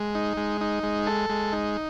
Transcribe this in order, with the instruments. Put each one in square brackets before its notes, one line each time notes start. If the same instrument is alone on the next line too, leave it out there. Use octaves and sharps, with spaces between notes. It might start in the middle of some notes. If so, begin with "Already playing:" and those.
Already playing: [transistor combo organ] G#3
D#4
G#3
D#4
G#3
A4
G#3
D#4